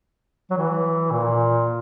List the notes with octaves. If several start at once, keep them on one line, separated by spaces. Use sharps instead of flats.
F#3
E3
A#2